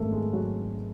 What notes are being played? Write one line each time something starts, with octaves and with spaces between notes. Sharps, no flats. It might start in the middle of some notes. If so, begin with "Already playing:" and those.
Already playing: G#1 F#2 D#3 G3 A3 A#3 A4 A#4
G#3 G#4
F#3 F#4